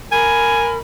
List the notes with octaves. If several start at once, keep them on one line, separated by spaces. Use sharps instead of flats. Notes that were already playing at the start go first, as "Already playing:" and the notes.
A#4 G#5 B5 F6